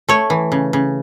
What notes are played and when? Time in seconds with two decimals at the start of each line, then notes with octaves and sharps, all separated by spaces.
0.09 A3 C#5
0.30 E3
0.52 C#3
0.73 C#3